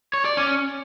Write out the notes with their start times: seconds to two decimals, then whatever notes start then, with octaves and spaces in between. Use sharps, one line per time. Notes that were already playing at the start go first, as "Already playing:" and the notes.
0.14 C#5
0.25 D5
0.37 C#4